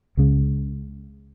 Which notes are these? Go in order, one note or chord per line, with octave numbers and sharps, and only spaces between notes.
C#2 C#3 G#3